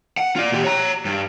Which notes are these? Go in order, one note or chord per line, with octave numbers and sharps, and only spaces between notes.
F#5
F4 D5
A#2 G4
C#5 A#5
G2